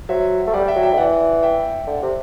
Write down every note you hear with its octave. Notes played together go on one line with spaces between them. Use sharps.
F#3 C5 E5
A3
G3 D5 F#5
E5 G5
F#3
E5 G5
D3
E3 D5 F#5
E5 G5
D3
C3